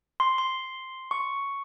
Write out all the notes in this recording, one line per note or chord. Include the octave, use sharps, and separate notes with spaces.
C6
C6
C#6